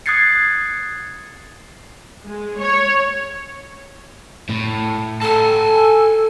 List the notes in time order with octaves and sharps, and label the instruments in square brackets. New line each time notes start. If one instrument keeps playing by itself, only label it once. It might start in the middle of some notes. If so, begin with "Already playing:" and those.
[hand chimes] D#6 F#6 G#6 A6 C7 C#7
[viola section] G#3
C#5
[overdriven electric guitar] A2
[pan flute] A4 [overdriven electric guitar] G#5 A5